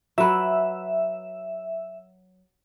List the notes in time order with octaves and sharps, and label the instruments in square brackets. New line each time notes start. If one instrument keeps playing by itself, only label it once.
[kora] F#3 B4 [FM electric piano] E5